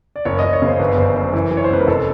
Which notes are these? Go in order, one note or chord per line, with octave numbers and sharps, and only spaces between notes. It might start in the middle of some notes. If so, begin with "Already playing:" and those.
D5
F#1 C#5
F#1 D#5
C#5
C#3 C5
G1 B4
G1 C5
F#2 C5
E3
E3
C#5
C5
C#2 B4
A#4
F1 A4